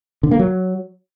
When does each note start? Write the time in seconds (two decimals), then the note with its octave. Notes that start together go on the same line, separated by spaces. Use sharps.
0.23 D3
0.31 A#3
0.39 F#3